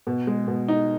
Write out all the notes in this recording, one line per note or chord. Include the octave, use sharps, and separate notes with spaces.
B2
G#3
B2
D#4